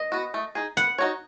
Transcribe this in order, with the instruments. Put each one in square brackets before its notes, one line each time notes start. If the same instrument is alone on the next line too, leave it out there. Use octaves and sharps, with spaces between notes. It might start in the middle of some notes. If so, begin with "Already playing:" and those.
Already playing: [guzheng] D#5
[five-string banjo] B3 F#4
A3
D#4 G#4
[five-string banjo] B3 [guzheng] F#5
[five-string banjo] D#4 F#4 C#5